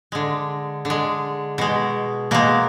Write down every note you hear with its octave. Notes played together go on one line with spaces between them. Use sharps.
D3 G#3
D3
G#3
B2 G#3
B2 G#3 A#3